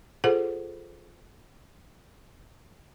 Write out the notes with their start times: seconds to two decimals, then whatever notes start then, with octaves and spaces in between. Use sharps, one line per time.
0.24 F4 G#4 A4 C5 F#5